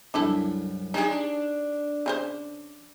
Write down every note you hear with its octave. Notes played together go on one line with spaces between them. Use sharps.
C2 F#2 D4 E4 A4
G#3 D4 D#4 G4 G#4 C#5
D4
C#3 F4 C5